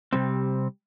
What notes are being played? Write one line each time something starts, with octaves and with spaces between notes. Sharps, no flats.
C3 G3 C4